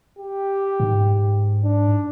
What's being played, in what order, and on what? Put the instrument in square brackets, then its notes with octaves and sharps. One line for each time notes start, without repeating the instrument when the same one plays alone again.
[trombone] G4
[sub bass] G#2
[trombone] D4